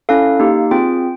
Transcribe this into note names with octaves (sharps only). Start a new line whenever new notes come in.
C#4 E4 A4 F5
A#3 D#4 G4
C4 F4 G#4 G5